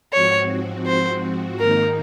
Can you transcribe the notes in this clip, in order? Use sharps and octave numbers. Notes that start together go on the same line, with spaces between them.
G#2 F3 C4 F#4 C#5
C5
G#2 D#3 A#3 D#4 A#4